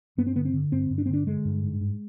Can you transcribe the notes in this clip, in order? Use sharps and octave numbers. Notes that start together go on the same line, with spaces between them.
G2 B3
C4
D3 B3
C4
D3
G2 C4
G2
D4
C4
D3 D4
D3 G#3
G2
G#2
G#2